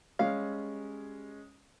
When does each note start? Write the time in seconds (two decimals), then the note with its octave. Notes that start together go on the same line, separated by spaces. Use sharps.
0.19 G3 G#3 C#4 F5